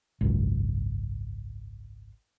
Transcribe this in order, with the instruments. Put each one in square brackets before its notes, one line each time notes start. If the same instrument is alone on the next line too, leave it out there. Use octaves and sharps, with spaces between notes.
[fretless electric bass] G#1 C#2 F#2